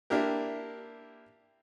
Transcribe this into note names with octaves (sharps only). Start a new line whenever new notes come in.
A#3 D4 E4 G4 A#4